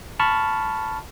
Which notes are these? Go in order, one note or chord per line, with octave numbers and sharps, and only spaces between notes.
A5 B5 C#6 F6